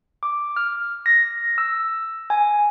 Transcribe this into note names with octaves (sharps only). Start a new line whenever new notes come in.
D6
F6
A#6
E6
G#5